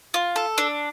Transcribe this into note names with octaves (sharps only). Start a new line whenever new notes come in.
F4
A4
D4